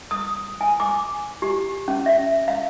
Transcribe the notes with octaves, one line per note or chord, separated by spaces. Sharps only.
D#6
G#5
D6
G4
C#4
E5
F5